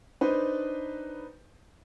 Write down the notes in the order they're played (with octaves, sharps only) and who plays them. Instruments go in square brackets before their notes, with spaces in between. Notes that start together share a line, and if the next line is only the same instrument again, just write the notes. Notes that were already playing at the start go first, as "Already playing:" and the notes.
[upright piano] D4 D#4 B4 C5